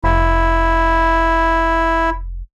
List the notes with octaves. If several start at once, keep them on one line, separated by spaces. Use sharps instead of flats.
F1 E4